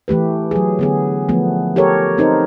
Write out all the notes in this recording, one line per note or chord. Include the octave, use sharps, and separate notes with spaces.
E3 A3 G4 B4
F#3 G#4
D3 B3 G#4
F3 A3 B3
G4 A4 A#4 C#5
C4 D#4 A#4 C5